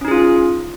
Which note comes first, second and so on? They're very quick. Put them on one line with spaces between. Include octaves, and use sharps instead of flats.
C#4 D#4 G#4 F4